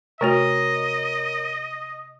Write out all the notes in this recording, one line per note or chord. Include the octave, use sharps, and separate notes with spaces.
C3 A3 F#4 A#4 C#5 D#5